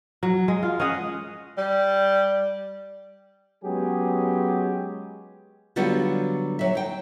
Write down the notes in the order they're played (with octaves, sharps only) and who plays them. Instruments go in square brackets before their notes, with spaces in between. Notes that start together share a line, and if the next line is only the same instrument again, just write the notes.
[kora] F#3
G#3
F4
C#4 G#4 D#5 F#5
[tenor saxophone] G3
[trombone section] F#3 G#3 B3 C#4 G4 G#4
[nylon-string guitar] D3 F#3 G3 B3 F4 F#4
F#3 E5
D#4 G5